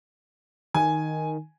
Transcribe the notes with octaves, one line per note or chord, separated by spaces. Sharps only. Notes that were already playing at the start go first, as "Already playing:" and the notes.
D#3 G#5